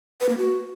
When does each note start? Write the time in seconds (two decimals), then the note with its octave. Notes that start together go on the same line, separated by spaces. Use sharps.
0.21 B4
0.29 A#3
0.38 F#4